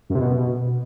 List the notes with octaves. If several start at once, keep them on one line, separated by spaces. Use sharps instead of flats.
F#2
C3
B2